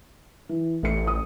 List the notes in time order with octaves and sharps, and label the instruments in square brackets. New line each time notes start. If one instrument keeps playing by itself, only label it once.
[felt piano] E3
[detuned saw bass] A1 [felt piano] A3 C#7
[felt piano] D#6